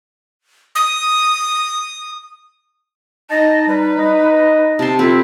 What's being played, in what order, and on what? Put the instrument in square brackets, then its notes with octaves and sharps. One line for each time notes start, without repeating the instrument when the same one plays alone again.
[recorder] D#6
[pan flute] D#4 [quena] D#5 [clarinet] A5
[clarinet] G3 [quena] B4
[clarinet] D#5
[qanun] C3 C6 [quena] A5
[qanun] C4 [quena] E4 [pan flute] F4 [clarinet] A4